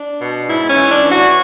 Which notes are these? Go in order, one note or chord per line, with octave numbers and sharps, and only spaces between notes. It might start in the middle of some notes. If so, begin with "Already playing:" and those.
Already playing: D4
B2
G#2 E4
C#4
E3
D4
E3
F#4